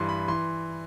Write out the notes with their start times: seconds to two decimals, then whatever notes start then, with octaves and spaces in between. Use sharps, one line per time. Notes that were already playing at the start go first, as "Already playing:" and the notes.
Already playing: G2 E3 C6
0.09 B5
0.28 E3 C6